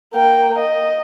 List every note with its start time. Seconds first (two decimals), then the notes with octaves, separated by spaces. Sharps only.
0.14 A#3 G5
0.58 D#5